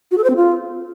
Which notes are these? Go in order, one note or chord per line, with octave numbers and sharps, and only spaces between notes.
F#4
A4
C5
C4
F4